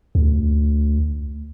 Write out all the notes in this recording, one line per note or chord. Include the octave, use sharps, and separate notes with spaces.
D2